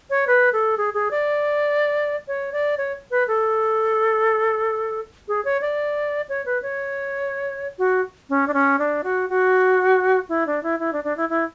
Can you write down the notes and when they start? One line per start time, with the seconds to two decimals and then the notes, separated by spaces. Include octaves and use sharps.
0.10 C#5
0.27 B4
0.53 A4
0.77 G#4
0.94 G#4
1.11 D5
2.28 C#5
2.53 D5
2.78 C#5
3.11 B4
3.28 A4
5.28 G#4
5.45 C#5
5.61 D5
6.29 C#5
6.46 B4
6.62 C#5
7.78 F#4
8.29 C#4
8.48 D4
8.54 C#4
8.79 D4
9.04 F#4
9.29 F#4
10.29 E4
10.47 D4
10.63 E4
10.80 E4
10.93 D4
11.04 D4
11.17 E4
11.29 E4